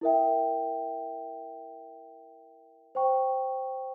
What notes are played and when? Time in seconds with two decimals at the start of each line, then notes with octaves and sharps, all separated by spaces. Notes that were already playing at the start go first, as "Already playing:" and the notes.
0.01 E4 A#4 E5 G5
2.95 C5 G5 C#6